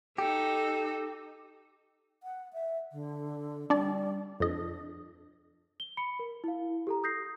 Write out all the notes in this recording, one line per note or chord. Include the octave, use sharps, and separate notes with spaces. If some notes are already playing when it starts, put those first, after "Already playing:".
D#4 G4 A4
F#5
E5
D3
G3 D4 D5
F2 D4 D#5
G7
B5 C#7
A#4
E4 F5
G4 A4 A#5
D#6 G6 A#6 C7